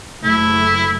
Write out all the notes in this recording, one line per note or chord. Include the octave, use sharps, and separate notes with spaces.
F#1 A3 E4